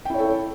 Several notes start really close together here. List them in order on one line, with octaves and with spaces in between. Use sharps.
G5 E4 C#5 A4